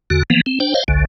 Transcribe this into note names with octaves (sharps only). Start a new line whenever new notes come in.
E2 D3 F#4
E3 F3 A#3 B3
C4
D4 C5 G5
C5 C#5 D#5 F5
G#1 C#2 D3